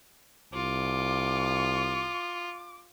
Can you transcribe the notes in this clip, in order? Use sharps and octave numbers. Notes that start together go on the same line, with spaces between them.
C2 F4 D6